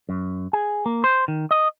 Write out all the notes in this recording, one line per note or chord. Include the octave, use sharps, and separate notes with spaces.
F#2
G#4
A#3
C5
D#3
D#5